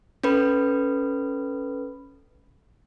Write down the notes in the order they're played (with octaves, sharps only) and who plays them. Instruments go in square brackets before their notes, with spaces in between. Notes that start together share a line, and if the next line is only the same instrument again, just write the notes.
[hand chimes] C#4 A4 B4 B5